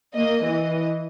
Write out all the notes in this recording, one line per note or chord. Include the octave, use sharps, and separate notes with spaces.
A#3 D#5
E3 D#5